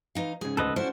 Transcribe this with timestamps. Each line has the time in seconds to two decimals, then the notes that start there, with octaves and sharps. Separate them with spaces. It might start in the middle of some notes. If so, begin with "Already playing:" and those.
0.15 E3 D#4 F5
0.41 G#2 C#3 G#4
0.57 D2 A4 B4 D#5
0.76 C#4 D4 E4 F#4 C5